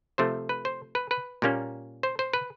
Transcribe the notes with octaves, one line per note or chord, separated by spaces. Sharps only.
C3 F3 A3 C5
B4
C5
B4
B4
A#2 G3 A#3 C#4
C5
C5
B4